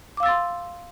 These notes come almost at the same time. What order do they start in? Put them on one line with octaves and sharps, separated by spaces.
D6 F5 E6 A6 C6